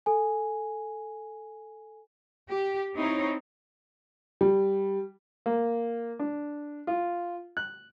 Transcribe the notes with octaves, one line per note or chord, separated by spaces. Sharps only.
A4 G#5
G4
C4 D#4 E4 C#5
G3
A#3
D4
F4
F#6